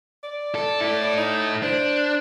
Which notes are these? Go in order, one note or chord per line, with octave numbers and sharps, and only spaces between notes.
D5
A4
E4 A4
D#4
D4 C5